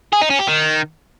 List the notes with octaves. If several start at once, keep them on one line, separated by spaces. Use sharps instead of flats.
G#4
D#4
C#4
G4
D#3